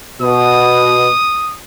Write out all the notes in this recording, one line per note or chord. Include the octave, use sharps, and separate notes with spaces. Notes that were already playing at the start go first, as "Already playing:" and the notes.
B2 D#6